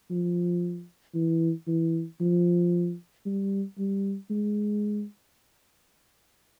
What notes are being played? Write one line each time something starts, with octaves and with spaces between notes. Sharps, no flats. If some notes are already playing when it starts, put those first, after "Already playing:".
F3
E3
E3
F3
G3
G3
G#3